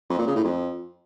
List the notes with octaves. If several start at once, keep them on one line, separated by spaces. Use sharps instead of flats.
F2
A#2
C#3
A2
F2